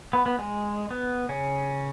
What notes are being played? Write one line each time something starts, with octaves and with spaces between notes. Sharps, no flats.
B3
B3
G#3
B3
C#3 C#4